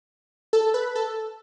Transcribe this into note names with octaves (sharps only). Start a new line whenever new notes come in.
A4
B4
A4